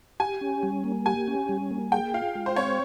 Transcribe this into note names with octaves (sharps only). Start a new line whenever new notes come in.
G4 G#5
C#4
G3
A#3
G4 G#5
C#4
G3
A#3
G#4 G5
F4 F5
G#3
C5
C4 C#5